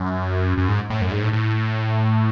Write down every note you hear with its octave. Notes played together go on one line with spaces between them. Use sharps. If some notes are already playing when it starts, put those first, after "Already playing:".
Already playing: F#2
F#2
G#2
A2
F#2
G#2
A2
A2